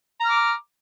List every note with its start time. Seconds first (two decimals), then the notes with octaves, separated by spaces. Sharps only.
0.21 A#5
0.25 F6
0.30 D6